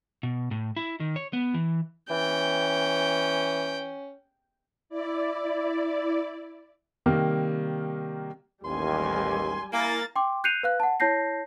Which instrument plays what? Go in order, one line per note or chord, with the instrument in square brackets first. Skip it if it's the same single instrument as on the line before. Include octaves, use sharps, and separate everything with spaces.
[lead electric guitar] B2
A2
E4
D#3
C#5
B3
E3
[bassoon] E3 [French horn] C#4 [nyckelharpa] G5
[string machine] E4 D5
[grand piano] C3 D#3 G3 A#3
[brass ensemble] A1 D#2 [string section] G3 G#5 [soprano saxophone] C6
[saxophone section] A#3 [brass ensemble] E4 [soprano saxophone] G#5 [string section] A#5 A6
[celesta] G5 C6 D6
F#6 G6 C7 C#7 D#7 F7
B4 F5 F#6
F#5 A5
E4 C#5 A5 G6 A#6 C7